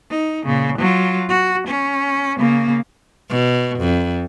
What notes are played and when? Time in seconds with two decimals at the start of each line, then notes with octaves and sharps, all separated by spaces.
0.10 D#4
0.46 A#2 C#3
0.78 F#3 F4
1.29 F#4
1.68 C#4
2.38 C#3 A#3
3.30 B2
3.80 F2